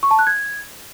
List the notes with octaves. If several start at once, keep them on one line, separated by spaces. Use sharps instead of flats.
C#6
A5
F#6
G#6